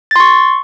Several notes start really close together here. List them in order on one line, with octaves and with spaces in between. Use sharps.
A6 C6 C#6